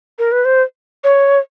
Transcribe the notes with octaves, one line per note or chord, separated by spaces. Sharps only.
A#4
B4
C5
C#5